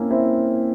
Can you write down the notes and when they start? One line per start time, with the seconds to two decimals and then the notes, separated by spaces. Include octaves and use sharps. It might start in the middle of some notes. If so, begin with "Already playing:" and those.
Already playing: A#3 C4 C#4 E4
0.10 C4 E4